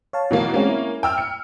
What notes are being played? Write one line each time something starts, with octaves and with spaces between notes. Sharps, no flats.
C#5 F5 A5
B2 E3 A#3
G#3 A#3 C4 C#4
E4
G5 E6 F6
C#7